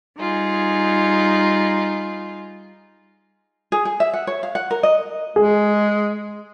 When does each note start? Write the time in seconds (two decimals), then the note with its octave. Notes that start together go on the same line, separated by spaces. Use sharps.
0.19 G3 D#4 F4 G#4
3.72 G#4
3.85 G#4
4.00 E5
4.14 F#5
4.27 C#5
4.43 F5
4.55 F#5
4.71 A#4
4.83 D#5
5.36 G#3 G#4